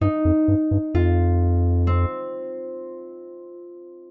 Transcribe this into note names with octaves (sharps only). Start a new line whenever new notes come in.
G2 D#4
F2
G2
G2
F2 F4
C4